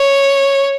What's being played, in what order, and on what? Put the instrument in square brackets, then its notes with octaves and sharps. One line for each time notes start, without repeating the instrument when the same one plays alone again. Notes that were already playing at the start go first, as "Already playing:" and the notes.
Already playing: [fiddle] C#5